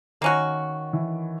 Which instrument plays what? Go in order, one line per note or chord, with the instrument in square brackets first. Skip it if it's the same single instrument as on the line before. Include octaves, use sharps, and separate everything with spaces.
[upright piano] D#3 [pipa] A#3 C#4 F#4
[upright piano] E3